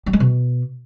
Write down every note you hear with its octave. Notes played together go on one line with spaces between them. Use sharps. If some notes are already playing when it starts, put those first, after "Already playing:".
G3
G#3
B2